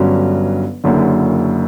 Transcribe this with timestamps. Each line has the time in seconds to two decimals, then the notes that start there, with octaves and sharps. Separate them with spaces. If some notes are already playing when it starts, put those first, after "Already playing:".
Already playing: G1 G2 D3 F#3 C#4
0.84 F#1 F#2 D3